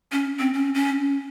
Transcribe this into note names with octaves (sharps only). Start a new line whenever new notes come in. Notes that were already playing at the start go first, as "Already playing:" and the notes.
C#4
C4
C#4
C#4